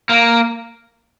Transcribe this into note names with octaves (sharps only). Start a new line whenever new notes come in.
A#3